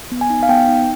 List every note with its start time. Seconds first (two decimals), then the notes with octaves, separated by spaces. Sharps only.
0.12 B3
0.21 G#5
0.30 D#4
0.43 F5
0.49 B3 G5
0.68 D#4